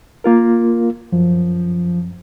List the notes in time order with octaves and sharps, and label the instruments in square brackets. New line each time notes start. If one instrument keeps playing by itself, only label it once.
[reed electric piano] A#3 F4 A#4
[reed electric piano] F#2 [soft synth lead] F3